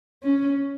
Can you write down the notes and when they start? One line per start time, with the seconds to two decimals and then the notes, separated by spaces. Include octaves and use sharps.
0.23 C#4